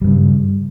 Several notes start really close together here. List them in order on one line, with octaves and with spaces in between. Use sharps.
G3 G2 C#3